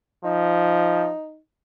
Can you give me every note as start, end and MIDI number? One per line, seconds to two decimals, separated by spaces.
0.25 1.10 53
0.25 1.39 63